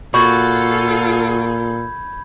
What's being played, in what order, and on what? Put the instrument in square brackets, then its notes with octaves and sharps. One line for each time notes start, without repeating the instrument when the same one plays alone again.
[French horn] A#2 [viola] F4 A4 [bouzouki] F#4 [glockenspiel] B5 G6 G#6